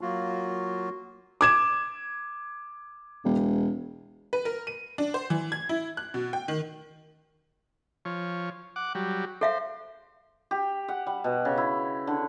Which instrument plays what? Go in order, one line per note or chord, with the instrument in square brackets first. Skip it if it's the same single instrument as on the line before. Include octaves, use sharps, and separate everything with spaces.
[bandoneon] F#3 A#3 F4 F#4
[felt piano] D6 G#6 E7
[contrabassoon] E1
[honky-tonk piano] B4
A#4
D#7
D4
C5
E3
G#6
E4
F#6
B2
G5
D#3
[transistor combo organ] F3 C#5
F#5 D6
F#3 G3
[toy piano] A4 E5 F5 [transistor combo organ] C5
[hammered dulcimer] G4
F#5
G3
B2
C#3
E4
D3